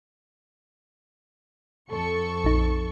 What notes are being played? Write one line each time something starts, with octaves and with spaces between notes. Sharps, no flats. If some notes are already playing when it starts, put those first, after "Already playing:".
F2 A4 C#6
A#1 D#4